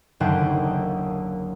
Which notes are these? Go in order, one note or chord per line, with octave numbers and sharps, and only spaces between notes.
F#1 D#2 D3 F#5 G5 D#6